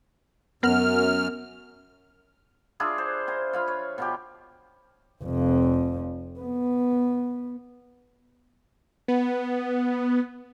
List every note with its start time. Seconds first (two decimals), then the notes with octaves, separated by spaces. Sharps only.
0.63 F#2 B3 A#4 F#5 F6
2.80 D4 E4 F4 G#4
2.98 C5
3.27 C5 G#5 A#5
3.53 F4 F5 B5
3.68 C#5
3.98 B2 F4 G4
5.24 F1 F2
6.39 B3
9.08 B3